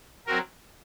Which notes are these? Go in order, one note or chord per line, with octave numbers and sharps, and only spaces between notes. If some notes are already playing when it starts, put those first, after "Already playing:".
F#3 C4 F#4 A#4